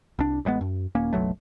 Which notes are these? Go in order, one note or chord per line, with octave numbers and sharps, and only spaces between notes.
C2 D4
A1 G3 G#3 B3
F#2
D#1 A#3 C#4
F#1 B1 F#3 A3